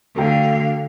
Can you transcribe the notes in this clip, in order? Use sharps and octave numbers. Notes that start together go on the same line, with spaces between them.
D3 A3 F#4 F5 G5